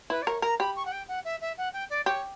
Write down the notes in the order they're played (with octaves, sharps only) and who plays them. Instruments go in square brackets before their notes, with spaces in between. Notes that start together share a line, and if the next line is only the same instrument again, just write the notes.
[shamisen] E4 [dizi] B4
[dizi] D5
[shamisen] A#4 [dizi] C#5
[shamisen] A#4 [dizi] A#5
[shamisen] G4 [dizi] B5
[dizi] C#6
F#5
G5
F#5
E5
E5
F#5
G5
D5
[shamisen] G4 [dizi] C#5